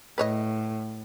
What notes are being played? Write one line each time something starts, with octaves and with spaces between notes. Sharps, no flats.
A2 B4 C#5 D#5